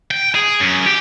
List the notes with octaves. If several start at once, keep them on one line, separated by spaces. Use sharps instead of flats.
G5
G#4
F#2
G4